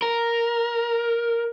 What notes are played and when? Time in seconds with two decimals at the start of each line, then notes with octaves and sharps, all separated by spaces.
0.02 A#4